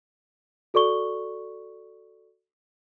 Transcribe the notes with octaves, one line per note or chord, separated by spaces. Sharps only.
F#4 A4 D5 C#6 G7